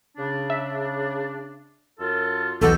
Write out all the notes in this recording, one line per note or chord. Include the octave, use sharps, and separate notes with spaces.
C#3 D4
E5
F#2 F4 A4
B1 E2 B3 D#4 F#4 G4 A4